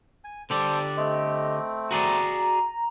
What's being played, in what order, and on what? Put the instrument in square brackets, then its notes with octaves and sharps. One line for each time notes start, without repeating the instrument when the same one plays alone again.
[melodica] G#5
[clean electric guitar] D3 G4 D5 [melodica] A4 C5
[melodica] A3 C4 [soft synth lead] D#5
[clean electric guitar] F#4 G#4 D5 [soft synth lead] A#5